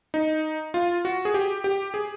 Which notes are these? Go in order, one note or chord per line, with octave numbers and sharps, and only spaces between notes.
D#4
F4
F#4
G#4
G4
G4
G#4